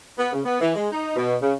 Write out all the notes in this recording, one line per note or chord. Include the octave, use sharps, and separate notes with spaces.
B3
C#3
B3
E3
G#3
D#4
B2
C#3